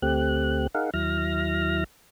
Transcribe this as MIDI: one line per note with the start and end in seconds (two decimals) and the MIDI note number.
0.02 0.67 38
0.02 0.67 57
0.02 0.67 60
0.02 0.67 67
0.02 0.67 90
0.74 0.90 63
0.74 0.90 68
0.74 0.90 70
0.74 0.90 77
0.74 0.90 78
0.94 1.84 39
0.94 1.84 54
0.94 1.84 64
0.94 1.84 89
0.94 1.84 94